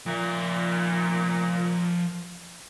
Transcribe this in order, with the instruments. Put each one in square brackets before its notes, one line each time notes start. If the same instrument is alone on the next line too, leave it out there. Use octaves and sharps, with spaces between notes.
[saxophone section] A#2 [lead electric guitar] F3 E5